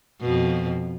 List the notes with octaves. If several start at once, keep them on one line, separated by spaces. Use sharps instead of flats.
F2 B2